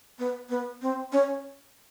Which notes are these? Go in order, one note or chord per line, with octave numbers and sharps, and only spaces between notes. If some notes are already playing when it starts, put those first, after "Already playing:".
B3
B3
C4
C#4